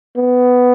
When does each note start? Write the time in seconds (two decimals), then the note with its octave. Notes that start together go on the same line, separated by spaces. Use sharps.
0.17 B3